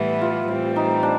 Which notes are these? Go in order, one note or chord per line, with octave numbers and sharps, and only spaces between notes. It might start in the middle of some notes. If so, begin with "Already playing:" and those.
Already playing: A2 E3 G3 B3 E4
F4
A2 E3 G3 C4
D#4
D4